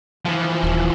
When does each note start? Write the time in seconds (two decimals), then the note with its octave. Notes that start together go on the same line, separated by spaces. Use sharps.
0.25 E3 F3
0.63 D#1